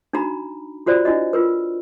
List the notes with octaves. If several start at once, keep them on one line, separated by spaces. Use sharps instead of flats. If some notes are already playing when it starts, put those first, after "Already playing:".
D4 D#4 F#4 A#5 B5
F4 F#4 C5 D5
D4 E4 F#4 D#5
F4 A#4 B4